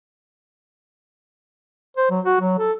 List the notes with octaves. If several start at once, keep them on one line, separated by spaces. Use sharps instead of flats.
C5
F#3
F#4
F#3
A4